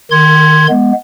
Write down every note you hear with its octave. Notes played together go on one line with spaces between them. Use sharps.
D#3 C6 G#6
G#3 B3